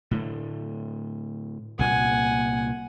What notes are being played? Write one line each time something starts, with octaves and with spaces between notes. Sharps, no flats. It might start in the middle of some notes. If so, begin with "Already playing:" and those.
A2 D3 A3
C2 A#2 A#3 F#5 G#5